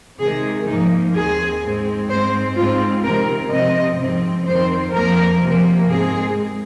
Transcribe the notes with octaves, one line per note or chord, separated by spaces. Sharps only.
C3 D#3 G#3 G#4
G#2 F3 A#3 D#4
D#2 D#3 C4 G#4
G#2 G#3 C4
G#2 G#3 C4 C5
G#2 G#3 C4 F4
C3 D#3 C4 A#4
C3 F3 C4 D#5
G#2 F3 G#3 C4
F2 D#3 C4 C5
F2 F3 A#3 A#4
C3 F3 A#3
G#2 G#3 C4 G#4